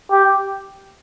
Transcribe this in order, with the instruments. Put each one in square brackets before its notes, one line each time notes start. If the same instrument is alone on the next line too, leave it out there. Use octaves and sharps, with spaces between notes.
[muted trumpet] G4